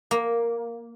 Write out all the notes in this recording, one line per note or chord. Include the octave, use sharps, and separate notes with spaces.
A#3